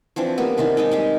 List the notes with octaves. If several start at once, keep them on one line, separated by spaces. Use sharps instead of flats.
E3 F3 C4 D4
G3 A#3 B3
C3 D#3 E3 D4
G#3 D#4 A4 D#5
G3 G#3 G4